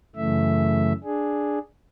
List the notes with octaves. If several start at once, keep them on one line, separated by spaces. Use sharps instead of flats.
F#2 C#3 E3 A3 E5
D4 G#4